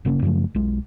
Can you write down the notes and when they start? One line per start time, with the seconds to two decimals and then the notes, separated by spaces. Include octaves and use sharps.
0.05 G1 C#3 A#3 C#4
0.22 F#2 C#3 F3 A3
0.55 B1 G#3